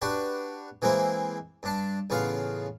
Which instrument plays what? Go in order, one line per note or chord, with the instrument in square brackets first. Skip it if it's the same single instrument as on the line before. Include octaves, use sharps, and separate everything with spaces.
[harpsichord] D4 F#4 G4 B4
E3 G#3 A#3 C4 E4
G2 D4 A5
A1 C#3 B3 F4 F5